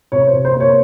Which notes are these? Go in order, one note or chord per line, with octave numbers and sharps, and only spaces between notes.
C3 C#5
C5
C3
C5
A#3
C#5